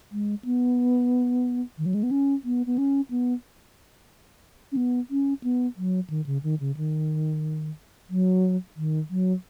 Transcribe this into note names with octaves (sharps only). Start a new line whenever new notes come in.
G#3
B3
D#3
F#3
G#3
B3
C#4
B3
B3
C#4
B3
C#4
B3
C#4
B3
F#3
D#3
C#3
D#3
C#3
D#3
F#3
D#3
F#3